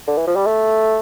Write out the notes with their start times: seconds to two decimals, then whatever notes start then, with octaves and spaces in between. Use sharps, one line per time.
0.07 D3
0.17 E3
0.27 F3
0.36 G3
0.46 A3